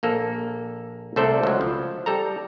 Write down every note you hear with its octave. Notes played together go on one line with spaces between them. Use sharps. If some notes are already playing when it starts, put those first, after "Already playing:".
A#1 A#3 A4
C2 A3 A4 C5 D5
C#2 F#3
F3
G3 A4 A#5